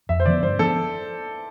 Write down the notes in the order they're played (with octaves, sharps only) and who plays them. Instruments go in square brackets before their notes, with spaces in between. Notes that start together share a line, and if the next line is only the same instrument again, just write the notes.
[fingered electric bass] F2 [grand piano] E5
[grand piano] C5
[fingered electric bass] D3 F3 B3 [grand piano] D5
[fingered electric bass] G2 [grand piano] C5
[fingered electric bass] F3 B3 D4 [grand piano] A4